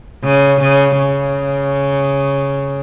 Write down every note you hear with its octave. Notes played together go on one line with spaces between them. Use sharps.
C#3
C#3
C#3